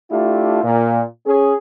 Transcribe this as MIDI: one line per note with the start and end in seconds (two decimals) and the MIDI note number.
0.11 0.62 57
0.11 0.62 62
0.11 0.62 64
0.11 0.62 65
0.11 0.62 67
0.64 1.01 46
1.26 1.54 61
1.26 1.54 68